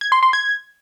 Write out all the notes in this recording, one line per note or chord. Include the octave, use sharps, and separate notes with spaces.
G#6
C6
C6
G#6